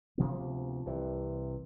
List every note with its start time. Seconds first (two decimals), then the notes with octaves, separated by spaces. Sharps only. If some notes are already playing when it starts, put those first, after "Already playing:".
0.18 D2 C3 F3 B3
0.86 C2 C3 E3